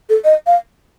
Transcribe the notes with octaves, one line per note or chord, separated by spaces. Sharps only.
A4
D#5
F5